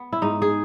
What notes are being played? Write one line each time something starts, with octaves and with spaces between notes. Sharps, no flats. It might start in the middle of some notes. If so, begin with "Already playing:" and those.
Already playing: B3
E4
G#2 D#4
G#4